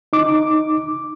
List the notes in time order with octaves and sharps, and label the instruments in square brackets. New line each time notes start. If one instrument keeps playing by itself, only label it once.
[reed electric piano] D#4 D6